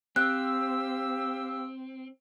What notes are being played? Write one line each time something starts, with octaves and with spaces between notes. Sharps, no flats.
C4 G4 F5 E6 F#6